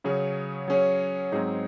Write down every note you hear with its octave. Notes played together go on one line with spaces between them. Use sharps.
C#3 F#3 C#4 G#4 C#5
F#3 C#4 G#4 C#5
G#2 F#3 C4 D#4 G#4